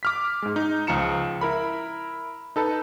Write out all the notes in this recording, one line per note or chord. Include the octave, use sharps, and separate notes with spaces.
D6 F6 B6
G#2 G#3
D#4
C#2 F3 A#5 C#7 E7
E4 A#4 B5
D#4 A4 B4 A5